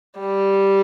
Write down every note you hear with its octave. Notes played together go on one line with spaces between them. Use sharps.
G3